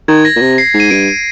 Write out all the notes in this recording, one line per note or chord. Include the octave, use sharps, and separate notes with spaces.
D#3 G#6
A#6
A#2
C3
C7
G#2
D#7
G2 D7